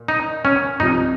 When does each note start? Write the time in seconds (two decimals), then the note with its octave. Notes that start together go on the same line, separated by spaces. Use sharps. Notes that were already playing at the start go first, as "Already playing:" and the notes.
Already playing: A#2
0.08 D#4
0.45 C#4
0.80 C2 C3 F3 D#4